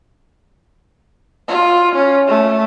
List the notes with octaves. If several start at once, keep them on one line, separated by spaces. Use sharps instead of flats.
F4
C#4
A3